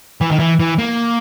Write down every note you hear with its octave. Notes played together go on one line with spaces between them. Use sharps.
E3
D#3
E3
E3
A#3